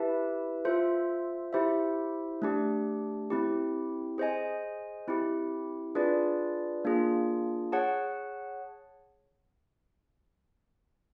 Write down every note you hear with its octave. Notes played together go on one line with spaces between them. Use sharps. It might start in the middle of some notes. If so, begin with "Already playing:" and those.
Already playing: E4 G4 B4 E5 A5
F4 A4 C5 E5
E4 G4 C5 E5
A3 D4 G4
C4 E4 G4
G#4 C5 D#5 G#5
C4 E4 G4
D4 F4 G#4 B4 D5
A#3 D4 F4 G#4
G#4 C#5 F#5 A5